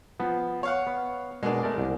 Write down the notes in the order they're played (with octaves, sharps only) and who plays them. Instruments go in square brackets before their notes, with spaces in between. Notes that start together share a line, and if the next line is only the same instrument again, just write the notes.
[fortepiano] F3 [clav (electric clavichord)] B3
[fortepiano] C#5 F5 F#5
[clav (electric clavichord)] B3
[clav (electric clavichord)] B2 [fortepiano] G#3 A#3 D4
[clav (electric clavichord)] A3 A#4 D5
C2